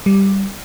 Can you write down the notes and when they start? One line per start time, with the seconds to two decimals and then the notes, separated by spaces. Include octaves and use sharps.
0.06 G3